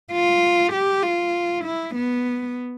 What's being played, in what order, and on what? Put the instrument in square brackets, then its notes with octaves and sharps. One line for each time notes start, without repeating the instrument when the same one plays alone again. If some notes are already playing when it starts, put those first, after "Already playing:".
[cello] F4
G4
F4
E4
B3